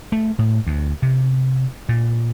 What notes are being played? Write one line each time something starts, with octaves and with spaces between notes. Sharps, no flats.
A3
A2
D2
C3
A#2